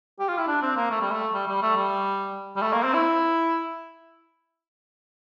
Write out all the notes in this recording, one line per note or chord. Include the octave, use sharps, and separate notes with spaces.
G4
F4
E4
D4
C4
A#3
A3
G3
A3
G3
G3
A3
G3
G3
A3
A#3
C4
E4